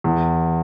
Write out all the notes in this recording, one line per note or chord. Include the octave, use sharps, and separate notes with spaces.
E2